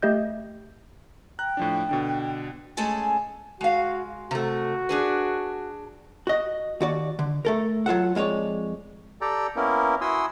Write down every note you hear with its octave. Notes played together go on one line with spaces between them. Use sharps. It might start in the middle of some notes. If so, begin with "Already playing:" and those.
A3 G4 D#5 G6
G5 A#5 F#6
A2 F3 D4
B2 D3 D4
G#3 A3 C#4 G#4 A4 G#5
G#3 F#4 F5
C3 A3 F#4
D4 G#4 B4
F#4 D#5
D#2 F#4 D5
D3
A3 A4 A#4
F#3 F4 A4 F#5
F2 G#3 F4 C#5 D5
G4 A4 D5 G5 A#5
A#3 B3 C#4 E4 A#4
E4 F#4 G#5 C6 D#6 E6